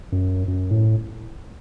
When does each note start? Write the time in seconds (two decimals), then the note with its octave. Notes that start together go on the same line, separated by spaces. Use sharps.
0.12 F#2
0.48 F#2
0.71 A2